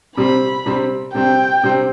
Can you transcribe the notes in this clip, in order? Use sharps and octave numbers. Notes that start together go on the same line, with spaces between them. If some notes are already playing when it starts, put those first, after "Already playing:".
C3 G3 C4 B5
C3 G3 C4
C3 G3 C4 G5
C3 G3 C4